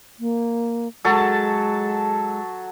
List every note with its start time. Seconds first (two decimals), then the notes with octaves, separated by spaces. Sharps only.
0.20 A#3
1.05 F#3 G#3 A4 A5